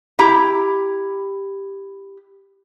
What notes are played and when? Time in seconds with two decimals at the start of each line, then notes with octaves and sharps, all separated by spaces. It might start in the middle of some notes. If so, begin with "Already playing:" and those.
0.19 E4 G4 A#5